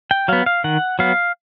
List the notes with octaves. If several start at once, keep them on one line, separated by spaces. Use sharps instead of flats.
G5
F#3 B3 F5
F5
D#3 F#5
F#3 B3 F5